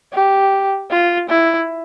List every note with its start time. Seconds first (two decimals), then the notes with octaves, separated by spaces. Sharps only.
0.13 G4
0.90 F4
1.29 E4